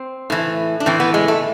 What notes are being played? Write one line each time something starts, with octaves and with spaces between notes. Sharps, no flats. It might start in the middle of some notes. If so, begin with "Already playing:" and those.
Already playing: C4
A2 E3
D4
A2 E3 C4
B3
G#3
A3